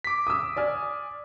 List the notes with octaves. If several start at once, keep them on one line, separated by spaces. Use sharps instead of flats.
D6 B6
D#6 E6
D5 G#5 F6